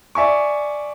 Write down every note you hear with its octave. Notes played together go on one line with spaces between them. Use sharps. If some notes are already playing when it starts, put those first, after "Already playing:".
D5 E5 G#5 C#6